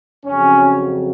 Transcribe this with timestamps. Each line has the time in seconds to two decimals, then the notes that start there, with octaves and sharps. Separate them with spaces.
0.25 F2 C#3 F#3 C#4